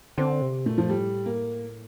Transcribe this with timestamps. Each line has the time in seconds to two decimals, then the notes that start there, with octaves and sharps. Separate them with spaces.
0.18 D3 C4
0.42 C3
0.66 A#2 A3
0.78 F3
0.90 A2 G3
1.26 A#3